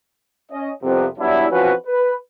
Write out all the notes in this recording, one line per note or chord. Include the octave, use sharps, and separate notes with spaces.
C#4 D#5
C2 F2 C3 B3
F#3 G3 B3 D4 E4
E3 F3 C4 C#4 F#4 B4
B4